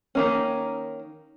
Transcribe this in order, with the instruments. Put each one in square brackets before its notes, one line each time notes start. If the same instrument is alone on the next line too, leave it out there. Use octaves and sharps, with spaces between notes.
[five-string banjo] D#3 A#3 C#4